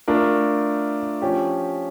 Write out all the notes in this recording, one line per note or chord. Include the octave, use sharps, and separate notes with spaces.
A3 D4 F4 A#4
F3 C#4 G4